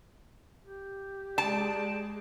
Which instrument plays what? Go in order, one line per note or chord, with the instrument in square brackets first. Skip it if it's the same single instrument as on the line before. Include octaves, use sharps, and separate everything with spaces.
[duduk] G4
[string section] G#3 [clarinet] D5 [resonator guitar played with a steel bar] A5